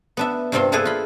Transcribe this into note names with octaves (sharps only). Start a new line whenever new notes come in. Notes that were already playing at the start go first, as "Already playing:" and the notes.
B3 D4 E5
G2 C3 G3 C4 F4
A#3 D4 E4 G#4 A4 B4
F4 B5